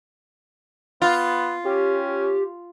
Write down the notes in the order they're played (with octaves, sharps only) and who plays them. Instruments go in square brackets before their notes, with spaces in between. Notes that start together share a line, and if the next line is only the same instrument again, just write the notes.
[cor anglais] B3 [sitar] F4
[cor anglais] C#4 [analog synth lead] G4